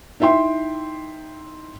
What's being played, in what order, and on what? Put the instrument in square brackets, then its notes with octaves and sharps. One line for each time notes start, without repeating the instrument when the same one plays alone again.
[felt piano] D#4 E4 E5 G5 C6